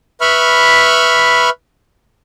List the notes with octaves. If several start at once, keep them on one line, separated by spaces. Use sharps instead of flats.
B4 E5 B5 C#6 F6